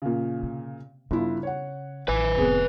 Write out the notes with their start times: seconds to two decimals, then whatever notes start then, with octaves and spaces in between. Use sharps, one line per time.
0.02 A#2 C#3
0.43 C3
1.11 G1 C#3 E4 F4
1.43 C#5 F#5
2.08 A1 B4 G#5
2.37 F1 A2 B3 C4 G#4